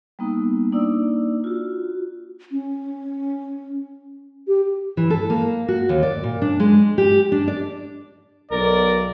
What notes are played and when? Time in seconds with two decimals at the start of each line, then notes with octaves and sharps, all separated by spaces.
0.19 G3 A#3 B3 D#4
0.72 A#3 D4 D#4 D5 E6
1.44 F4 F#4
2.52 C#4
4.48 G4
4.97 E3
5.10 A4
5.30 A#3
5.68 F#4
5.89 D#2
6.03 D5
6.24 A#2
6.42 D4
6.60 G#3
6.98 G4
7.32 D4
7.48 D5
8.51 B1 A#4 D5